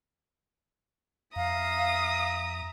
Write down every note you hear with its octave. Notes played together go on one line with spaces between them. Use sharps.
F2 E5 F5 A#5 D#6